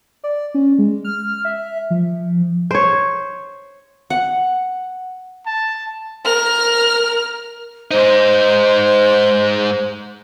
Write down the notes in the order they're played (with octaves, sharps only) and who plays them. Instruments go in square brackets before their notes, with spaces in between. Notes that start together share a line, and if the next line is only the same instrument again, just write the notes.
[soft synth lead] D5
C#4
G#3
F6
E5
F3
[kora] C5 C#5
[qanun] F#5
[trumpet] A5
[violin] A#4 F6
[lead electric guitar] G#2 D#4 [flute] C5